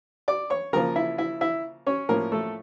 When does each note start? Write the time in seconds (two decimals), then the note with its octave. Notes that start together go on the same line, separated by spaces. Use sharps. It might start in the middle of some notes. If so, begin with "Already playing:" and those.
0.28 D5 D6
0.50 C#5 C#6
0.73 C#3 F3 A#3 A#4 A#5
0.96 E4 E5
1.18 E4 E5
1.41 E4 E5
1.87 C#4 C#5
2.09 A2 F3 A#3 C#4 A#4
2.32 A3 A4